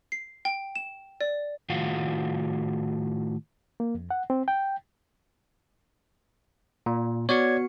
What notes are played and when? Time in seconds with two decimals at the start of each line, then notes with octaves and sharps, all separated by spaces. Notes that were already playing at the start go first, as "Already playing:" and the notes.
0.12 C7
0.45 G5
0.76 E7
1.21 D5
1.70 A2 D#3 F4 F#4 F5 F#5
3.80 A#3
3.95 F2
4.10 F#5
4.30 C4
4.48 G5
6.86 A#2
7.29 B3 F#4 C#5 D5 G#6 C#7